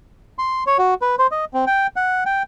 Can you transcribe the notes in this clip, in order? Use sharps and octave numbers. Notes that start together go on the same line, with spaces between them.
C6
C#5
F#4
B4
C5
D#5
C4
G5
F#5
G5